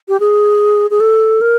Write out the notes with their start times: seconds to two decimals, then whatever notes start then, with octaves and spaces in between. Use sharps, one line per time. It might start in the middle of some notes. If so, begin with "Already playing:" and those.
0.09 G4
0.20 G#4
0.91 G#4
1.00 A4
1.41 A#4